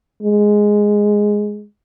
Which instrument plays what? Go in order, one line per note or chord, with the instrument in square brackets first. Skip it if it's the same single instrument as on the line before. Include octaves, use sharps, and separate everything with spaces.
[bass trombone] G#3